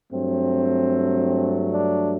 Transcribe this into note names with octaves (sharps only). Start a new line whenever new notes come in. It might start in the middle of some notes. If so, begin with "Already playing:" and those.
G2 F#3 A3 C4
D4